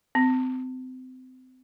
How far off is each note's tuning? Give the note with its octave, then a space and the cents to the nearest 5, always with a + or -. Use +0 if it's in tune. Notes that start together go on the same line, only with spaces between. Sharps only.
C4 -30